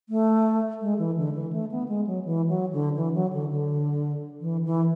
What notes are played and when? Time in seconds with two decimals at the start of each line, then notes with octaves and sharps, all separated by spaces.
0.09 A3
0.81 G#3
0.99 E3
1.17 D3
1.35 E3
1.53 A3
1.71 B3
1.88 G#3
2.07 F#3
2.25 E3
2.49 F#3
2.73 D3
2.96 E3
3.14 F#3
3.33 D3
3.50 D3
4.40 E3
4.64 E3